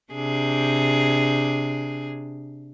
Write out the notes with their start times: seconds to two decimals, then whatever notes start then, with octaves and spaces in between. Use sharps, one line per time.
0.13 C3 D4 G#4